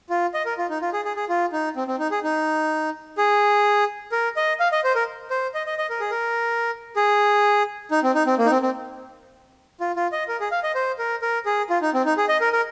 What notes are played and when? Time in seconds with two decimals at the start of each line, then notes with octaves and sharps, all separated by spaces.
0.10 F4
0.34 D#5
0.45 A#4
0.58 F4
0.70 D#4
0.82 F4
0.93 G#4
1.05 G#4
1.16 G#4
1.29 F4
1.53 D#4
1.76 C4
1.88 C4
1.99 D#4
2.11 G#4
2.23 D#4
3.18 G#4
4.12 A#4
4.36 D#5
4.60 F5
4.72 D#5
4.84 C5
4.95 A#4
5.30 C5
5.54 D#5
5.66 D#5
5.78 D#5
5.90 A#4
6.00 G#4
6.11 A#4
6.96 G#4
7.91 D#4
8.03 C4
8.15 D#4
8.26 C4
8.39 A#3
8.46 D#4
8.50 C4
8.62 C4
9.80 F4
9.96 F4
10.12 D#5
10.28 A#4
10.40 G#4
10.51 F5
10.63 D#5
10.75 C5
10.99 A#4
11.22 A#4
11.46 G#4
11.70 F4
11.82 D#4
11.94 C4
12.05 D#4
12.17 G#4
12.29 D#5
12.41 A#4
12.53 A#4